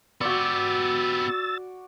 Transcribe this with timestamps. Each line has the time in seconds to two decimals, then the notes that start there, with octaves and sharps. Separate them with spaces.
0.21 B3 F#4 G4 D5 E6 A6